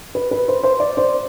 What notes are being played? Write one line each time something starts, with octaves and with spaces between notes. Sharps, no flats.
B4
B4
C5
C5
D5
C5